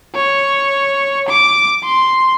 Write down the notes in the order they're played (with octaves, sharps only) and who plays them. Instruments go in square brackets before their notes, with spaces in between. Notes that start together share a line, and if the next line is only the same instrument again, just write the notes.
[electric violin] C#5
D6
C6